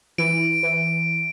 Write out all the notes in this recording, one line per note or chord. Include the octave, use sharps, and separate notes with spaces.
E3 D7
E3